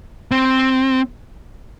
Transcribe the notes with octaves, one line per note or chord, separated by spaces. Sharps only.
C4